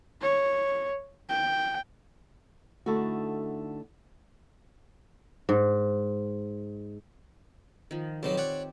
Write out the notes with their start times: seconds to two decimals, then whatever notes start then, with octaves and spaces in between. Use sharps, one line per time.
0.22 C#5
1.30 G5
2.86 D3 A3 D#4 E4 F#4
5.49 G#2
7.91 D#3 F3
8.23 B1 B2 F#3 C4 G4
8.38 C#5 D5 F#5